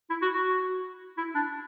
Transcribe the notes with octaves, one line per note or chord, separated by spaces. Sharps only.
E4
F#4
F#4
E4
D4